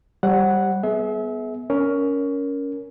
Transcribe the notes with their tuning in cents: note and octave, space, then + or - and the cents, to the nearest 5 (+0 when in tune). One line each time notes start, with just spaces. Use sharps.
G3 +0 C5 +40 F#5 +0
B3 +0 G#4 +35 E5 -30
C#4 +15 A#4 +0